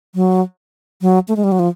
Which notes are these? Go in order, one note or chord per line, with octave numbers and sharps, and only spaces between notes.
F#3
F#3
A3
G#3
G3
F#3
F3